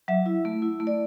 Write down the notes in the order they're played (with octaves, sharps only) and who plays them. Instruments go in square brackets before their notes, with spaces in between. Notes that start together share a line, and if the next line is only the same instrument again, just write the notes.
[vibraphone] F#3 E5
E4
A3
E4
A3
D5